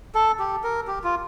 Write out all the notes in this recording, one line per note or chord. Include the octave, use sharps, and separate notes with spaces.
A4
G4
A#4
G4
F4